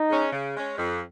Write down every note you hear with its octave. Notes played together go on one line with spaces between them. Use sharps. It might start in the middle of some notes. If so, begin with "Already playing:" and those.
Already playing: D#4
G#3 C#4
C#3
G#3 C#4
F2